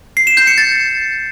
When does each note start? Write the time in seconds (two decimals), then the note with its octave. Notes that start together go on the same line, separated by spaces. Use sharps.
0.17 C7
0.27 E7
0.37 G6
0.47 C#7
0.58 A6